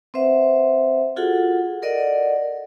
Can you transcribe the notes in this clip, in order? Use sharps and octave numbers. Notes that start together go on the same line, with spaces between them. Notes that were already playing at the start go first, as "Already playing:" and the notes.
C4 B4 C5 E5 F#5
F4 F#4 G#4 A4 F#5
A4 A#4 D5 D#5 F#5